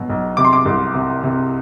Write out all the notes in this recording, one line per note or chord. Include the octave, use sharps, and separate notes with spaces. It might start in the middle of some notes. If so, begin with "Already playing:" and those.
Already playing: B2 F#3
B1
C3 D6
C6
D6
C2
C3
C3